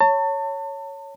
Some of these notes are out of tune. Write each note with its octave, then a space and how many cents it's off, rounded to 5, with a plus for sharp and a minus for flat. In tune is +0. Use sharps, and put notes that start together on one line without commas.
C#5 +0 A5 +35